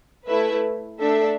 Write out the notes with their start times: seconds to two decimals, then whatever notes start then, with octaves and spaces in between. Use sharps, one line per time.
0.27 A3 E4 B4 E5
0.99 A3 D4 A4 E5